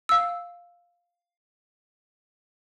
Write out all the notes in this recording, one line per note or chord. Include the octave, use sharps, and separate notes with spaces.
F5 E6